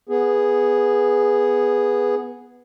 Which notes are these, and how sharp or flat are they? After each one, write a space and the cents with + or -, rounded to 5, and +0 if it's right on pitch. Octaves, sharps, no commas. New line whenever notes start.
B3 -5 G#4 -5